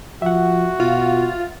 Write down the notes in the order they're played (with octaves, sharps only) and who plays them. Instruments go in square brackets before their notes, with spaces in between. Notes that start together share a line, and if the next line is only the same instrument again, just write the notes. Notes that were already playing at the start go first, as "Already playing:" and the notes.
[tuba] F3 [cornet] F#4 [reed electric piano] E5 F#5
[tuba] B2 [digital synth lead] F4